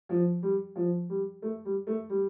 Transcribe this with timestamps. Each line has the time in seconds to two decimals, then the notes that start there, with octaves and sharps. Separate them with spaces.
0.09 F3
0.43 G3
0.76 F3
1.10 G3
1.42 A3
1.65 G3
1.87 A3
2.10 G3